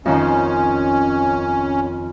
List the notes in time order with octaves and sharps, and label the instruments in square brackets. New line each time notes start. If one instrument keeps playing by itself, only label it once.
[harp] F2 D#3 C5 [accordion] C#4